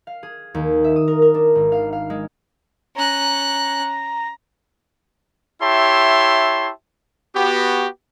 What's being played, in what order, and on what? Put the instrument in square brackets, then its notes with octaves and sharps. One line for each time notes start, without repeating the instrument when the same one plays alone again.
[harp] F5
G#4
D#2
E5
D#6
A#4
A#4
D4
G#1
F5
F5
G#3
[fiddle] C#4 F#6 [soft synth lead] A#5
[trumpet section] E4 G4 C#5 E5 A5 C6
B3 F#4 G4